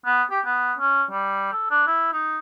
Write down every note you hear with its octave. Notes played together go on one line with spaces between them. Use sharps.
B3
G4
B3
C#4
G3
A4
D4
E4
D#4